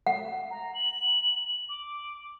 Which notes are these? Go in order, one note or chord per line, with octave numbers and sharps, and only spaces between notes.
F#5
A#5
F#7
D6